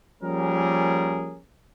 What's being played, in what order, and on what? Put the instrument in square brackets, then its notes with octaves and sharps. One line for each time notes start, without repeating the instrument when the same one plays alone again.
[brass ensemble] F3 G3 A#3 C#4 G#4 A#4